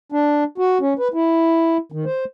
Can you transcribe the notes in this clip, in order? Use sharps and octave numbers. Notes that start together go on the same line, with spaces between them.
D4
F#4
C#4
B4
E4
D#3
C5